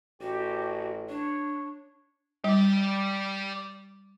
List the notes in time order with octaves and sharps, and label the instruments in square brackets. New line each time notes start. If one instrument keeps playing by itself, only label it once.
[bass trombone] A1 [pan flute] F#4 [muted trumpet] G4
[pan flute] D4 [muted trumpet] C#5
[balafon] G3 [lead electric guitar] G4 D5